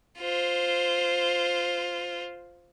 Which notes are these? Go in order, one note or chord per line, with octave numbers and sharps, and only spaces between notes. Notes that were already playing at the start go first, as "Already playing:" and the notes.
F4 C5